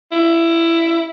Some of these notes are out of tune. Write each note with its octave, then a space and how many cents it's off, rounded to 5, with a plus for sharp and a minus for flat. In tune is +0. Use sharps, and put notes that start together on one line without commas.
E4 +15